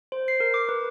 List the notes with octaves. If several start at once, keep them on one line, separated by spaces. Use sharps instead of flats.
C5
C7
A#4
D6
B4